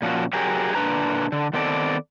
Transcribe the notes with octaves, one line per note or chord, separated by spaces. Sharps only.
A#2 F3 C#4 F#4
F#3 G4 G#4 A#4
A#2 D3 D4 B4 A#5
D3
D#3 B3 C4 A4 D5